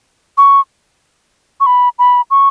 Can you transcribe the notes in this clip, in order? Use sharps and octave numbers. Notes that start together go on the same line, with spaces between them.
C#6
C#6
B5
B5
C#6